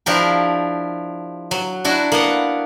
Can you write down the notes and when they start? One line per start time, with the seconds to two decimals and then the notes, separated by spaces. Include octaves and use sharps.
0.06 F3 D4 E4 G4 A#4
1.51 F#3
1.84 D4 E4 F#4
2.12 A#3 B3 F#5